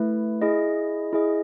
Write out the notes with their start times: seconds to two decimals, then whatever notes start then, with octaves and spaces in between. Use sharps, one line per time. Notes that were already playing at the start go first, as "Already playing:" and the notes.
Already playing: A3 E4 B4
0.41 E4 G#4 D#5
1.13 E4 G#4 D#5